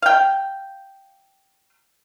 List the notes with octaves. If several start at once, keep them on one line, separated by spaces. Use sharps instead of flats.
F5 G5